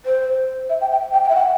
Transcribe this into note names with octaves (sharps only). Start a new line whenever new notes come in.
C5
E5
G5
G5
G5
G5
E5
F#5